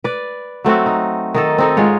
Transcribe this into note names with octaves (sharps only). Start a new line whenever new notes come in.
B4 D5
F#3 A3 C4 F#4
D#4
D#3 D#4 A4
C4 D#4 A4
G#2 G#3 F4 C#5